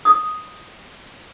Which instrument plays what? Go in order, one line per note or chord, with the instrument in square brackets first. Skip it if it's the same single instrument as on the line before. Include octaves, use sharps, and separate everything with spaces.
[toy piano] D#6